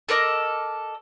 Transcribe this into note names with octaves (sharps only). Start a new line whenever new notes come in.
A4 A#4 D5 D#5